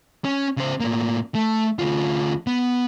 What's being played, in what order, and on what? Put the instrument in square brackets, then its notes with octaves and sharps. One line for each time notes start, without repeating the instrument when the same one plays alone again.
[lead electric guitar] C#4
C#3 C5
A2 A#3
A3
D2 F4
B3